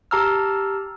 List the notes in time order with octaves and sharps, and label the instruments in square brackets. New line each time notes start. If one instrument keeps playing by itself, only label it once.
[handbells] G4 A5 A#5 E6 F6